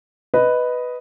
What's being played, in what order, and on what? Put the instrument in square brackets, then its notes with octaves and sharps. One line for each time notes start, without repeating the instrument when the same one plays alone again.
[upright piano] B4 D#5